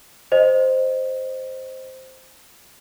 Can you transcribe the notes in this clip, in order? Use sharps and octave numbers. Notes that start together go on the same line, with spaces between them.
C5 D#5